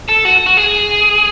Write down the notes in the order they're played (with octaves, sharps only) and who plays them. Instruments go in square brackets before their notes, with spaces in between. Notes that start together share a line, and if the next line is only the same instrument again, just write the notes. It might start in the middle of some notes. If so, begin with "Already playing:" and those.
[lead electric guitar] A4
F#4
F#4
G#4